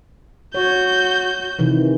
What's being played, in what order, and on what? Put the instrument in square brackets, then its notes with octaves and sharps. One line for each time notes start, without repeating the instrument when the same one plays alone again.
[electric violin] F#4 G6 [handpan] C#5
[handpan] C3 D#3 E3